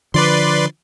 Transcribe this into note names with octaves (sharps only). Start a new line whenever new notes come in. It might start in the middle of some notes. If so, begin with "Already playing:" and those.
D3 F3 B4 D5 C6